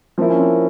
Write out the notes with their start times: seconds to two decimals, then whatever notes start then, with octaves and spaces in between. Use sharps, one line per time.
0.18 F3 A#3 C4 E4
0.29 C#4
0.39 C4